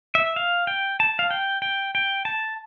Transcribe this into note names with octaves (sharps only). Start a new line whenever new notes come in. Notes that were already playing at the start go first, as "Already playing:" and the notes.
E5
F5
G5
A5
F5
G5
G5
G5
A5